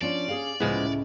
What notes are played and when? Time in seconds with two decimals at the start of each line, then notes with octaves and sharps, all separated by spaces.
0.01 F3 C#4 D4 D5
0.28 C#4 G#4 F5
0.60 C#2 A2 F3 G#3 B3 E4 G#4